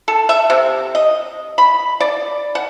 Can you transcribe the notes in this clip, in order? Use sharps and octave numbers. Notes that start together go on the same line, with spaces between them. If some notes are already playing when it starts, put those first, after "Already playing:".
A4
E5
C3
D#5
B5
D5
F#5